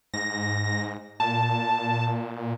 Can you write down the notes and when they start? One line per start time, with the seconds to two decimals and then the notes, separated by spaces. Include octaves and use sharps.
0.14 G#2 A#6
1.20 A#2 A5